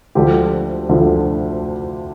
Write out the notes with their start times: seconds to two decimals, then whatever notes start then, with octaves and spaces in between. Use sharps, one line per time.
0.15 D2 D3 F3 G4
0.89 D2 D3 F3